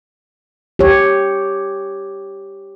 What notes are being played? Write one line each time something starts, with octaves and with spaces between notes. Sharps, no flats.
G4 C#5